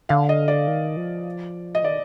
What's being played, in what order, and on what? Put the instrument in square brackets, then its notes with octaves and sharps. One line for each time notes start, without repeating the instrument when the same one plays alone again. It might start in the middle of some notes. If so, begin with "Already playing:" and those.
[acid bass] D3 [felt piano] F5
[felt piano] D#5
D5
[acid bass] D#3
F3
[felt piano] D#5
[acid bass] D#3 [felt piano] D5